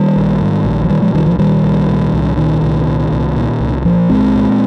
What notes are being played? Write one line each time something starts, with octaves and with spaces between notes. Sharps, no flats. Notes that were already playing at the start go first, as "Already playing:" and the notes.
Already playing: D#3 G3
A#1
G#2
A#1
F3
A#2 D#3 G3
F3 G#3
C2 D#3 G3
F3
A#2 D#3 G3
C2
A#2
C2
A#2 D#3
C2
A#2
C2
A#2
C2
A#2 F3
C2 G#3 C4
A#2